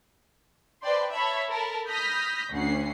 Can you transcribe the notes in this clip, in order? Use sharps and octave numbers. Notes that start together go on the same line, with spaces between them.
B4 C5 D5 G5 A5 C6
C#5 E5 A5 B5
A4 A#4 A5 B5
B5 D#6 F6 G6 A#6 B6
D2 C#4 F#5 C7